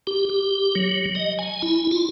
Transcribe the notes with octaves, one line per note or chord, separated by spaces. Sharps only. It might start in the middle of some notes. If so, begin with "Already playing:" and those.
G4
G4
F#3
D#5
G#5
E4
F4